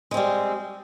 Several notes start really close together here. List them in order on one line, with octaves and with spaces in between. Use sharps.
G#3 C4 G3